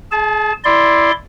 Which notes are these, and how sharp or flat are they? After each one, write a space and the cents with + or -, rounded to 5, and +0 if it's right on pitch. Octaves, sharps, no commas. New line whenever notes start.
G#4 +30 A5 -25
E4 +5 D5 +0 C6 +0